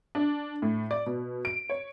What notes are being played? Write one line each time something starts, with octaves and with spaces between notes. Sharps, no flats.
D4
A2
D5
B2
D7
C#5